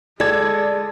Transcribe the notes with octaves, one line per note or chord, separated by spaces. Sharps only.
G#3 G#4 A4 D5 G#6